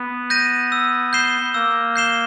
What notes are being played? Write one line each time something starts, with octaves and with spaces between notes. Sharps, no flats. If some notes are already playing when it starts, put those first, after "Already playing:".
Already playing: B3
G6 A#6 D#7
E6
G6 C7 E7 G7
A#3 E6
G6 C7 E7 G7